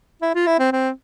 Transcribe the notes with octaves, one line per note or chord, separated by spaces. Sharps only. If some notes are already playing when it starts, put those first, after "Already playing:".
E4
F4
E4
C4
C4